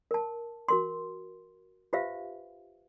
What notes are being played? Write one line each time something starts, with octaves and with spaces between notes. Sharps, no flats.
A#4 A5
F#4 A#4 C6
F4 G4 B4 C5 E5 F5